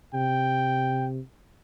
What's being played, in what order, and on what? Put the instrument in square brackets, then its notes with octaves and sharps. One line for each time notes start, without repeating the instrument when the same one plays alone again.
[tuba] C3 [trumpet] G5